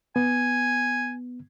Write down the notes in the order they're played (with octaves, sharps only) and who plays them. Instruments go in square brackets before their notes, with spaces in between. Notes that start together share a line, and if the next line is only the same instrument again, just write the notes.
[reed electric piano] B3 [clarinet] G#5